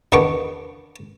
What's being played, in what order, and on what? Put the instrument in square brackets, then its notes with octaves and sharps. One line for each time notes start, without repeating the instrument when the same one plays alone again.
[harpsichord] E2 D#3 B3 D4 C#6 D6